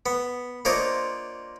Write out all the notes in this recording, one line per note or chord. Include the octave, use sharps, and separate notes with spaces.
B3
A#3 D4 F4 C5 C#5 D#5